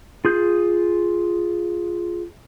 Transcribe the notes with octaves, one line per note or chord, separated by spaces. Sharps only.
F4 G#4 G6